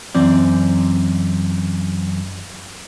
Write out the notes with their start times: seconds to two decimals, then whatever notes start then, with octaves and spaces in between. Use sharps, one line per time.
0.15 F#2 E3 C4 D5